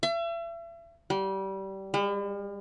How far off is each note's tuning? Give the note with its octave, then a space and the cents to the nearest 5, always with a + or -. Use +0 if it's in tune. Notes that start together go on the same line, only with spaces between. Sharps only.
E5 +40
G3 -20
G3 +45